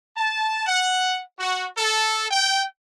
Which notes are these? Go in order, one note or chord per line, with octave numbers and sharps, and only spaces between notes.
A5
F#5
F#4
A4
G5